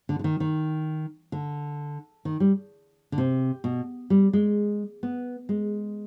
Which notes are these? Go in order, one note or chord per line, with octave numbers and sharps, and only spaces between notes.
D3
D3
D#3
D#3
D3
D#3
G3
D3
C3
B2
G3
G#3
B3
G#3